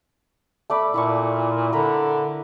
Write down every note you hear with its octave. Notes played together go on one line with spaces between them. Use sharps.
A3 D5 B5
A#2 E4 A5 C#6
D3 A#4 A#5 B5